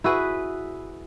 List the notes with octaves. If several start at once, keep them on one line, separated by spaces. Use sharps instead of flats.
E4 F#4 G#4 B4